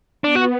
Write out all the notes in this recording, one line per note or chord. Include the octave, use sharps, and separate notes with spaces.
B3 D4
F#4